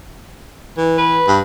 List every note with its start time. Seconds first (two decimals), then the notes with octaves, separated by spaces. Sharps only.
0.77 E3
0.98 B4
1.27 G2